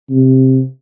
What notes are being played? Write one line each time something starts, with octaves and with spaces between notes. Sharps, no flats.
C3